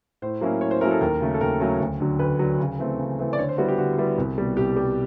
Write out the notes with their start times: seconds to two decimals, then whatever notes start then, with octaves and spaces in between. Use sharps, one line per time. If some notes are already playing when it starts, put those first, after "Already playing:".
0.22 A2 C5
0.41 F#3 A#3 C#4 E4
0.61 A2 C#5
0.71 C5
0.81 F#3 A#3 C#4 E4 A#4
0.91 A4
1.01 D#2 A#4
1.20 C#3 F#3 A3 C#4
1.34 A4
1.41 D#2 A#4
1.60 C#3 F#3 A3 C#4
1.81 D2
2.00 D3 F#3
2.19 D2 B4
2.39 D3 F#3
2.60 C#3
2.79 E3 A3 C4
2.99 C#3
3.19 E3 A3 C4
3.33 D5
3.38 D3 C#5
3.49 C5
3.58 G3 B3 E4 F#4
3.68 G4
3.78 D3 F#4
3.98 G3 B3 E4
4.18 C2
4.38 B2 G3
4.57 C2 G4
4.77 B2 G3